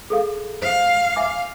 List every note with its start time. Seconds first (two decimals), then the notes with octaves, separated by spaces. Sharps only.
0.10 G#4 A4 F5
0.62 C5 F5
1.16 E5 G#5 D6